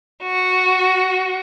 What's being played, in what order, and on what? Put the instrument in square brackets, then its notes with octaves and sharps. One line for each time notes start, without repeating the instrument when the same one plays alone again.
[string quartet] F#4